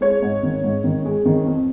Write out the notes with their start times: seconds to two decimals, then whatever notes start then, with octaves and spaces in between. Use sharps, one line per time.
0.01 G#3 C#5
0.22 G#2
0.43 D#3
0.64 G#2
0.84 D#3
1.05 G#3
1.26 D#3
1.46 F2